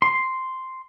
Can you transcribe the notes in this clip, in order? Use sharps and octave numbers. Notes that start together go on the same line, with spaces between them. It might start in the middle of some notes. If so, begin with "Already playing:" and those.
C6